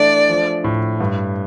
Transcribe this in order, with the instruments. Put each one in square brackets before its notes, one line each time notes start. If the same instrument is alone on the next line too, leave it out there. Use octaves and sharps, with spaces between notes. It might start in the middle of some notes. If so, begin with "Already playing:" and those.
Already playing: [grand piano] E3 A3 D4 [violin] D5
[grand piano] F3
A2
G2